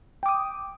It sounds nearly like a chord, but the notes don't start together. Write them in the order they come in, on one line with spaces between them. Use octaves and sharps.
G5 D6 D#6